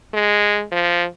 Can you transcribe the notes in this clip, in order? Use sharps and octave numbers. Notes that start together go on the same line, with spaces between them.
G#3
F3